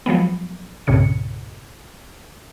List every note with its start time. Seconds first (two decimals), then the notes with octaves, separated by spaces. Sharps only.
0.06 F3 F#3 G#3 B3
0.87 C2 G2 A#2 C#3 C#7